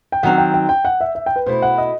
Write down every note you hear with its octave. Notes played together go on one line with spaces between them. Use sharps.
G5
D#3 F#3 C4 F#5
G5
G5
G5
F#5
E5
E5
G5
B4
B2 A3 E4 C5
F#5
D#5